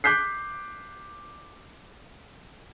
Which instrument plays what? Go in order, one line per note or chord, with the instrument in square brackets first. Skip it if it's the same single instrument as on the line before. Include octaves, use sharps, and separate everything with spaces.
[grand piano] D6 F#6 G6 B6 C7